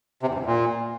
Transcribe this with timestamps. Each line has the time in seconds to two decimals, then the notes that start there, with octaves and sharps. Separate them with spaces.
0.23 C3
0.29 E2
0.34 G2
0.40 E2
0.46 A#2